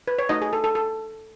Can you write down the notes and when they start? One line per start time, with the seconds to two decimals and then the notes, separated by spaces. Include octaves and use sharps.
0.08 B4
0.19 C#5
0.29 A3 D#4 F#4 D#5
0.42 G#4
0.53 A4
0.64 A4
0.75 A4